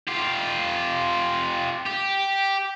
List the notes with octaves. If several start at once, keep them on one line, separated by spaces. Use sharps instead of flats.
F4 G4
G4